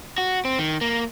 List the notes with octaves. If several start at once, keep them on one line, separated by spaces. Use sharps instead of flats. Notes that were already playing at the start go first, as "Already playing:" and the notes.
F#4
C4
D#3
A#3